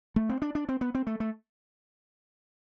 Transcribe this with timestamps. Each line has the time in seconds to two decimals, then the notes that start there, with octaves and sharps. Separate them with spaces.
0.16 A3
0.29 C4
0.42 D4
0.55 D4
0.69 C4
0.81 B3
0.95 C4
1.07 A3
1.20 A3